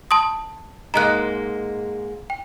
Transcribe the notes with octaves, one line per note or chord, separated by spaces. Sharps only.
A5 C6 D#6
G#2 G#3 A#3 A#5 F#6
G5